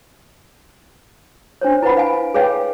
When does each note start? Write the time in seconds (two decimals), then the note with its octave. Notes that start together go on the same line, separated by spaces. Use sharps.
1.61 D4 C5 C#5
1.82 E4 B4 C5 F#5 B5
1.97 F5 G#5
2.34 G#4 B4 C#5 F5 G5 G#5